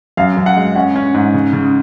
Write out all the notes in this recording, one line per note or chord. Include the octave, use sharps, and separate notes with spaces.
F#2 F5
F#2
F#5
G#3
C#4 F#5
C#4
G#2
C#3
C#3